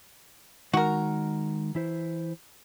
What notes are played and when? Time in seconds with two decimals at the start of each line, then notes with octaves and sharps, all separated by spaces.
0.73 D#3 G#3 D#4 F#4 A#4
1.75 E3 E4 C5